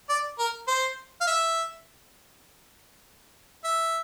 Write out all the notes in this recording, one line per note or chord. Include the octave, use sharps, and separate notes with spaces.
D5
A#4
C5
F5
E5
E5